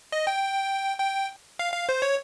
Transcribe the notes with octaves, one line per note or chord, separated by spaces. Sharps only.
D#5
G5
G5
F5
F5
C5
C#5